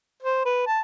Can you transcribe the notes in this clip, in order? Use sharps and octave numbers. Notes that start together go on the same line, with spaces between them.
C5
B4
A5